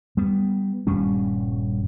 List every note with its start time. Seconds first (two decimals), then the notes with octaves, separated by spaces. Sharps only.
0.17 G3 B3
0.87 D#1 G2 G3 C#4